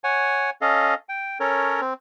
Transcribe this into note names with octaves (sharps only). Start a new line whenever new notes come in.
C#5 F#5 G#5
C#4 A4 D#5 F5
G5
C#4 A4 A#4 C#5
C4